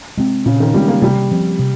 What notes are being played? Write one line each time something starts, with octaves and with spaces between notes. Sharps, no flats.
C3 G#3 C4
A#2 C#3
D#3
G3 G#3 C4
A#3
C3 G3
F3 C4
C3